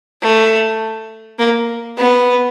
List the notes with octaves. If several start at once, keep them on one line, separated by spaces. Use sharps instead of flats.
A3
A#3
B3